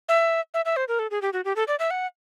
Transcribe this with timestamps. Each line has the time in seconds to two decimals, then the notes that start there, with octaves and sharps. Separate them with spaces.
0.09 E5
0.54 E5
0.65 E5
0.77 C5
0.88 A#4
0.99 A4
1.11 G#4
1.22 G4
1.33 F#4
1.45 G4
1.56 A4
1.68 D5
1.79 E5
1.91 F#5